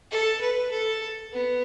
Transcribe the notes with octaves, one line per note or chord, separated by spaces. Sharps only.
A4
B4
A4
B3